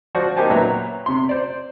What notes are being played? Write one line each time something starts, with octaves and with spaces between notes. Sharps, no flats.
F3 F#4 C5 D5
A#3 D#4 G4 C5 G#5 A5
A#2 F#3 B4 E5
C3 C6
C5 D5